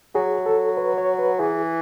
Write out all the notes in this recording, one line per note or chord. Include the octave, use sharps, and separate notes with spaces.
F#3 G#4
A4
B4
C#5
B4
E3 G#4